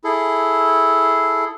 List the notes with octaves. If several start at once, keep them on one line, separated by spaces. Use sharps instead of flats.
E4 G#4 A4